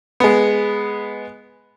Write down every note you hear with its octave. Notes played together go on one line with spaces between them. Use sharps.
G#3 B3